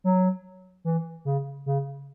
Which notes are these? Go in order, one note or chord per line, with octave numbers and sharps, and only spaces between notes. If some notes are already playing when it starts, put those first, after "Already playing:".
F#3
E3
C#3
C#3